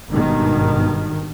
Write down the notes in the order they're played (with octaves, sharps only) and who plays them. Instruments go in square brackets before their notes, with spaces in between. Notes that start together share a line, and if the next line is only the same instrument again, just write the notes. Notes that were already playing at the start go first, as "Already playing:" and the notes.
[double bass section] G#1 G2 B2 D#3